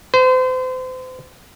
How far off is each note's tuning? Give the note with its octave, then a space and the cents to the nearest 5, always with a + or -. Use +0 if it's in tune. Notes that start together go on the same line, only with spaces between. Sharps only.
C5 -35